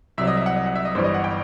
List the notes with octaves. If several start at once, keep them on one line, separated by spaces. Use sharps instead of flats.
C2 C3 F#3 E5
D#5
E5
F#5
D#5
F#5
E5
D#5
G1 G2 E3 G3 C5
D#5
F#5
G5